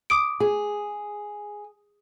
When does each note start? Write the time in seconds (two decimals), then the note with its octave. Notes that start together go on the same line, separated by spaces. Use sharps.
0.10 D6 D#6 D7
0.40 G#4